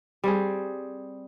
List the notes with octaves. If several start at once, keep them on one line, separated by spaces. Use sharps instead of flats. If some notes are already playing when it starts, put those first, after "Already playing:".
G3 C4 G#4